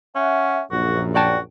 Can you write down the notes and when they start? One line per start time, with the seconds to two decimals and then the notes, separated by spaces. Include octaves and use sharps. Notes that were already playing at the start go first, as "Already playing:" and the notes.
0.16 C#4 E5 F#5
0.71 A#1 F#2 F#4
1.15 F#4 D5 G5 A5